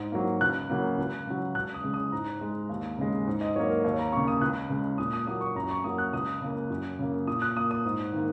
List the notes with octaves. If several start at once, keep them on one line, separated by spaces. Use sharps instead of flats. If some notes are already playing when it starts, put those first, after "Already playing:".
Already playing: G#2
F#3 A#3
C#2 F#6
C#3 F#3 A#3
C#2
C#3 F#3
C#2 F#6
D#6
C#3 G#3
D#6
G#2 A#5
G#3
D#2
C#3 G#3
G#2
D#5
F#3 A#3 C#5
A#4
D#2 C#5
A#5
C#3 A#3 C#6
D#6
C#2 F#6
C#3 G#3
A#2 D#6
D#6
F#3 A#3 D#6
C#6
F#2 A#5
C#6
F#3 A#3 D#6
F#6
C#2 D#6
C#3 A#3
F#2
C#3 A#3
A#2 D#6
F#6
A#3 D#6
D#6
G#2
D#3 A#3